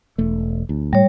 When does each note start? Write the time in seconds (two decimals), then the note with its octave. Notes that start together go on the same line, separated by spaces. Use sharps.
0.18 E1 A3
0.69 D2
0.93 A2 G3 C#5